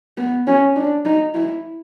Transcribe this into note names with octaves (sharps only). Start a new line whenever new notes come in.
B3
C#4
D4
D#4
E4